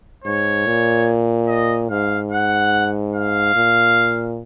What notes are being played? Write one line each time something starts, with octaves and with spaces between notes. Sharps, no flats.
G#2 C#5
A#2
D#5
G#2 F5
F#5
F5
A#2